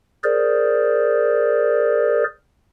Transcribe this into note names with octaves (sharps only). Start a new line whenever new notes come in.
G#4 A#4 C5 D5